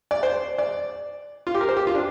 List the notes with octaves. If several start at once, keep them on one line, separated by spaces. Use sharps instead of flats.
D5
C5
D5
F4
G4
A#4
C5
G4
F4
D4